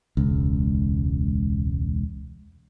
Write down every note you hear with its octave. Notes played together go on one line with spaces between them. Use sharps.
E1 C#2